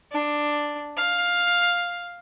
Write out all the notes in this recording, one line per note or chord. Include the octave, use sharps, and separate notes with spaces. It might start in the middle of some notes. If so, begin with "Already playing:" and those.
D4
F5